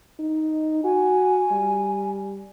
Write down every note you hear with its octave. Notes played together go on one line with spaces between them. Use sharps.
D#4
F#4 G#5
G3